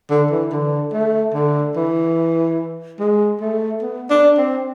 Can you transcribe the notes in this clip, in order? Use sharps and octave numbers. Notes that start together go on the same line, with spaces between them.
D3
E3
D3
A3
D3
E3
G#3
A3
B3
D4
C4